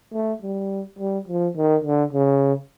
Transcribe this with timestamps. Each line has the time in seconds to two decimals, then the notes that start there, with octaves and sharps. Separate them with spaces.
0.13 A3
0.42 G3
0.99 G3
1.28 F3
1.57 D#3
1.84 D3
2.13 C#3